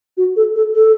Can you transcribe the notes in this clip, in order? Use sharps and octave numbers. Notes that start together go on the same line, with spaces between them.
F#4
A4
A4
A4